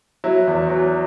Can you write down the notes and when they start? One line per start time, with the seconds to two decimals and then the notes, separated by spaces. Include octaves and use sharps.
0.24 F#3 E4
0.47 E2
0.70 F#3